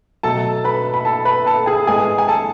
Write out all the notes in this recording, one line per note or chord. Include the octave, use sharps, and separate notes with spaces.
B2 F#3 A3 A4 A5
B4 B5
B5
A4 A5
B4 B5
A4 A5
G#4 G#5
A2 G#3 B3 G#4 G#5
G#5
A4 A5